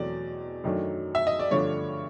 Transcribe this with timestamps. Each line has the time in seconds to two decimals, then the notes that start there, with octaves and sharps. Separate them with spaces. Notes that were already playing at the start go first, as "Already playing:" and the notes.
Already playing: E2 B2 F#3 A3 C4 D5
0.64 F#2 D#3 F#3 A3 D4
1.15 E5
1.27 D#5
1.39 D5
1.51 G2 D3 F3 A3 D4 C#5